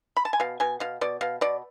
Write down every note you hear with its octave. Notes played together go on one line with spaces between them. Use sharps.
B5
A5
G#5
B2 F5
B2 G#5
B2 F5
B2 D5
B2 F5
B2 D5